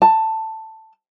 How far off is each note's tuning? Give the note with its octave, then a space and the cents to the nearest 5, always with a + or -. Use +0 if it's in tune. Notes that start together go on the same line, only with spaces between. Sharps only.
A5 +10